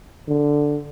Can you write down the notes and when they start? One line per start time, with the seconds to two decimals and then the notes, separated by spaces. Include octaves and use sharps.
0.28 D3